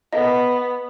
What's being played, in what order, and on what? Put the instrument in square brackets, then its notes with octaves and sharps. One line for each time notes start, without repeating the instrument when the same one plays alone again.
[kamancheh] B3 [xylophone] D#5